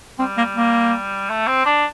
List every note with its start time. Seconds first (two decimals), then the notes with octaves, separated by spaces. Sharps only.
0.19 G3 C4
0.37 A#3
0.56 A#3
1.30 A3
1.47 C4
1.66 D4